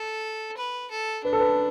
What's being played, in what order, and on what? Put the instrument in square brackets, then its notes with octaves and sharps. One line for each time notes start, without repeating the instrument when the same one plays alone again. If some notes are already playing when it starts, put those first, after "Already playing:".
Already playing: [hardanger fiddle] A4
B4
A4
[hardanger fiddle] D4 [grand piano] B4
[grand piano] A4
B4